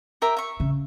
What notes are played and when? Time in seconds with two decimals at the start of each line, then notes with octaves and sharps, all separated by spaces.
0.22 G4 A#4 E5
0.37 E5 C#6
0.60 C#3